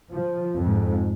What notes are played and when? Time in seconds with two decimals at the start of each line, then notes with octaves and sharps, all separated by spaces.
0.12 F3
0.58 F2 G#2